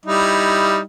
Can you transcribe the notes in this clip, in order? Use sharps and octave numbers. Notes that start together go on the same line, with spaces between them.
G3 D#4 E4